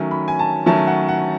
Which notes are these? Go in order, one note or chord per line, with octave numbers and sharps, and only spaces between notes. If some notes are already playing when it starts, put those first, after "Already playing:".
Already playing: D#3 F#3 A3 C#4
B5
G#5
A5
D#3 F#3 A3 C#4 A5
F#5
F#5